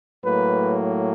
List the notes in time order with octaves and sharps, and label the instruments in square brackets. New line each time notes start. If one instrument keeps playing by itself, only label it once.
[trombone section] A2 F#3 A#3 B4